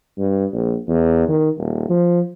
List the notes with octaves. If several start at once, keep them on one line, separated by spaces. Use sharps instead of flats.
G2
A#1
E2
D#3
D#1
F3